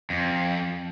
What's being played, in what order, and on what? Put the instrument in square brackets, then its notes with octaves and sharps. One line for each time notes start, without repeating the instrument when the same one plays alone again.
[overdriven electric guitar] F2